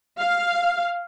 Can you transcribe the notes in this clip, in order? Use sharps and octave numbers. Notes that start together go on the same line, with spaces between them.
F5